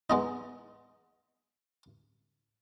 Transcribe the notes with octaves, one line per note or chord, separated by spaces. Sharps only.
G#3 B3 D#4